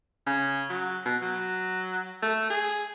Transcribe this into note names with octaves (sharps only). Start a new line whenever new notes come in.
C#3
F#3
B2
F#3
A3
G#4